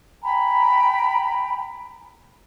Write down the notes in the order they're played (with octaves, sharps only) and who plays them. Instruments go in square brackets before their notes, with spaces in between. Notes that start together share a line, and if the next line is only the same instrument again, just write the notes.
[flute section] G5 G#5 A#5 B5